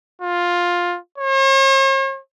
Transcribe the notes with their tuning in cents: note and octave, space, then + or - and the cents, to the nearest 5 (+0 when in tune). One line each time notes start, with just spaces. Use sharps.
F4 +10
C#5 -45